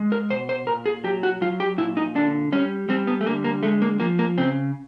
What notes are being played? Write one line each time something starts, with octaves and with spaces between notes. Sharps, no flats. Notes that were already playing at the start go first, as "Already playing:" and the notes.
Already playing: G#3
A#4
B2 C5
C5
A#2 A#4
G#4
F#3 G4
F#4
F#3 F4
G4
A#2 E4
D#4
D3 D4
G3 C#4
G3 C4
B3
A3
D3 A#3
A#3
G#3 A3
A#3
F3 A#3
A#3
C#3 C4